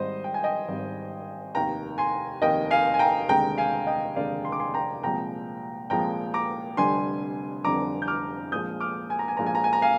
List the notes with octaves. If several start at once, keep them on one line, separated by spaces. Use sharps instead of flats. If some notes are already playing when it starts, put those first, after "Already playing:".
Already playing: G#1 G#2 G3 C5 D#5
G5
G#5
D#5 G5
G#1 G#2 G3
F1 D#2 D#3 G5 A#5
G#5 C6
F1 D#2 D#3 D#5 G5
F5 G#5
G#5
G5 A#5
F1 D#2 D3 G#3 G5 A#5
F5 G#5
D#5 G5
F1 D#2 D3 G#3 D5 F5
C6
D6
G#5 C6
G5 A#5
C2 A#2 F3 G#3 G5 A#5
C2 A#2 F3 G#3 G5 A#5
A#5 D6
F1 F2 D3 G3 G#5 C6
F1 F2 D3 G3 A#5 D6
G6
D6 F6
A#1 A#2 F3 G#3 D#6 G6
D6 F6
G#5
A#5
G#5
A#1 A#2 F3 G#3 A#5
G#5
A#5
G#5
A#5
F5 G#5